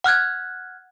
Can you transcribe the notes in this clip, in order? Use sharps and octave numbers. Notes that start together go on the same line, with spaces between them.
F#5 F6 F#6 G#6